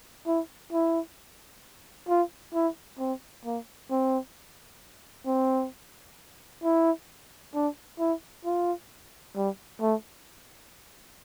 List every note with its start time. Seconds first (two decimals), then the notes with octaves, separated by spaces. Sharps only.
0.27 E4
0.73 E4
2.09 F4
2.54 E4
2.99 C4
3.45 A#3
3.91 C4
5.26 C4
6.64 E4
7.54 D4
7.99 E4
8.45 F4
9.36 G3
9.81 A3